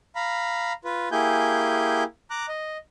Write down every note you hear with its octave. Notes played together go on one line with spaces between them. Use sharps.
F5 A#5 B5
F4 B4
A#3 E4 G4 G#4 G#5 G6
A#5 D6 F#6
D#5